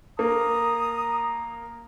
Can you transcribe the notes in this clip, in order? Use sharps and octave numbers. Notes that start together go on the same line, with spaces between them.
A#3 A#5 D#6